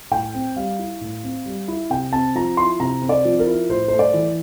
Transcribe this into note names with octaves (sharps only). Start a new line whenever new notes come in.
A2 G5
C4
G3 F5
E4
A2
C4
G3
E4
C3 G5
C4 A5
F3 A#5
E4 C6
C3 A#5
C4
D5
F3
A#4
E4
A2 C5
A3 C5
D5
E3